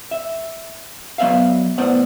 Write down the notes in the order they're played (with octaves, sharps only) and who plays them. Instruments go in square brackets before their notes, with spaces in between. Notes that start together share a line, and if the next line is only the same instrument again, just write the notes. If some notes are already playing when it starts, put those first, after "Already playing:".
[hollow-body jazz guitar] E5
F#3 B3 D5 E5 F5
A2 B3 C5 D5 F#5